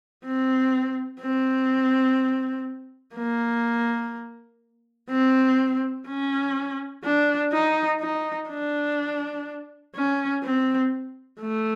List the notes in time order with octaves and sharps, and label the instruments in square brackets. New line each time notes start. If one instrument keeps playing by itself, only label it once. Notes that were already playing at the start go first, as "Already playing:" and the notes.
[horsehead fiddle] C4
C4
A#3
C4
C#4
D4
D#4
D#4
D4
C#4
C4
A3